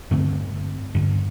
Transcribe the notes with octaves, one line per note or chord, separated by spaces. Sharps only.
G2 D3 A3 C4
G2 D3